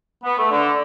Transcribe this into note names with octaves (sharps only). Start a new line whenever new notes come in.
B3
A3
D3